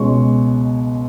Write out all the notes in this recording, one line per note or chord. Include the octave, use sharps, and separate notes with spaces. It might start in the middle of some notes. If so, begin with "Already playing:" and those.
Already playing: C#2 B2 G#3 C#5 C#6